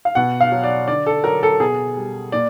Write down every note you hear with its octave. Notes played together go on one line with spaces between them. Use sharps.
F5
B2 F#5
F5
F#3
D5
D3 D5
A4
F#3 A#4
A4
B2 G#4
G3
A#2 D5